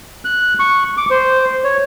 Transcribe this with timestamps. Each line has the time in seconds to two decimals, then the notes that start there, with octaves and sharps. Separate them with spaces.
0.25 F#6
0.59 C#6
0.97 D6
1.10 C5
1.64 C#5